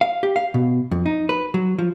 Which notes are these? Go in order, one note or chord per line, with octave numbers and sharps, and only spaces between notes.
F5
G4
F5
B2
F2
D#4
B4
F#3
F3